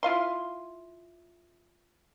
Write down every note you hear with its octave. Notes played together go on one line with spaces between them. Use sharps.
E4 F4 F5 C6